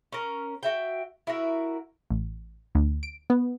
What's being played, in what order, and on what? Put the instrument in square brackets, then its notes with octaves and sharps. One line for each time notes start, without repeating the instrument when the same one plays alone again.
[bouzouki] C#4 A#4
F#4 E5 G5
E4 F#4 A#4
[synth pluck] A1
D2
D7
B3